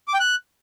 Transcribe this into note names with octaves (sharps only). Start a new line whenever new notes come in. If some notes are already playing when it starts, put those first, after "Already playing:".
D6
G5
F#6